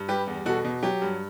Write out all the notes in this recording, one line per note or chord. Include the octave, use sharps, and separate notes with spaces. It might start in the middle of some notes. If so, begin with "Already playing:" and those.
Already playing: G2
G3 G4 B4
E2
B2 F#4 A4
B2
F#3 G4
G2